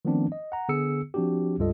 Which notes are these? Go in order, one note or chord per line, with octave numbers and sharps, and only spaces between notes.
D#3 F3 A3 B3 C4 D4
D#5
F#5 A#5
D3 B3 G#4 E6 C#7
F3 C4 D4 F#4 G4
C#2 G2 G3 F4 A4 D#5